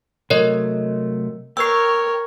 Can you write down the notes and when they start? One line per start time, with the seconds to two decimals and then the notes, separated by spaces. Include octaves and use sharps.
0.30 C3 F#3 A3 A#4 C#5 D#5
1.57 A#4 C#5 G5 E6 C7